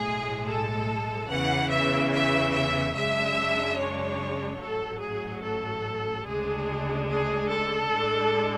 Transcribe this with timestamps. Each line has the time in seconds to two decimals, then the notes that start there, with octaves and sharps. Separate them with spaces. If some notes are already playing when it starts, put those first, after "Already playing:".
Already playing: B1 A2 G#3 G#4
0.46 A4
1.29 E2 C#3 E3 F#5
1.70 E5
2.12 E5
2.53 E5
2.95 F#2 C#3 G#3 D4 E5
3.78 C#5
4.60 A1 G#2 F#3 A4
5.01 G#4
5.43 A4
6.26 D2 C#3 G#3 D4 G#4
7.09 G#4
7.50 A4
7.91 A2 G#3 D4